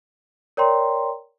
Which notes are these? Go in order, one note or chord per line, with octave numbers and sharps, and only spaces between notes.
A#4 C#5 D5 G5 A#5 C6